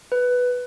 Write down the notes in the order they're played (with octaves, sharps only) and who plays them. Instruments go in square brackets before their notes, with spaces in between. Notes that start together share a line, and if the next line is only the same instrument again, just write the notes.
[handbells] B4